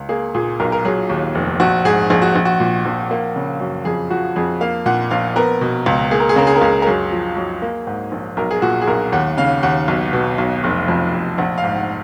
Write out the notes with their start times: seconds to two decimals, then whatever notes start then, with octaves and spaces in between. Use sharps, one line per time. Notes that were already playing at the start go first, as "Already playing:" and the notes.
Already playing: C#2
0.09 A#3 G#4
0.34 A#2 G#4
0.60 B1 A#4
0.72 A#4
0.85 F#3 G#4
1.10 D#2
1.35 F1
1.60 A#1 F#4
1.85 G#2 G#4
2.10 A#1 G#4
2.22 F#4
2.35 A#1
2.45 F#4
2.60 A#2
2.86 A#1
3.11 A#3
3.36 C#3
3.60 F#2
3.85 F2 G#4
4.10 F3 F#4
4.36 F2 G#4
4.61 A#3 F5
4.86 A#2 F#5
5.11 A#1 F5
5.36 B3 A#4
5.61 B2
5.86 C#2
6.11 A#3 G#4
6.20 A#4
6.29 G#4
6.36 C#3 A#4
6.47 G#4
6.56 A#4
6.61 C#2 G#4
6.82 A#4
6.87 F#2 G#4
7.12 F3
7.37 F#2
7.62 A#3
7.87 G#2
8.12 A#1
8.37 B1 A#4
8.51 G#4
8.62 A#2 F#4
8.82 G#4
8.87 B1 A#4
9.12 D#2 F#5
9.37 C#3 F5
9.63 D#2 F#5
9.88 B1
10.13 B2
10.38 B1
10.64 F1
10.88 F2
11.14 F1
11.38 A#1 F#5
11.58 F5
11.64 G#2
11.76 F#5